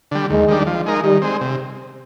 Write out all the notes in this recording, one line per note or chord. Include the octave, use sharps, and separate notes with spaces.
D3 G3
D#2 G#3
D#3 G3 D4
F3
G#3 D#4 A#4
D#3 G3
G#3 C4
C3